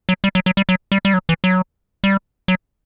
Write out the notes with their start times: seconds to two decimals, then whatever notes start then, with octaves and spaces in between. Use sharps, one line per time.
0.09 F#3
0.24 G3
0.35 F#3
0.46 F#3
0.57 G3
0.69 F#3
0.92 G3
1.05 G3
1.14 F#3
1.29 E3
1.44 F#3
2.04 G3
2.48 F#3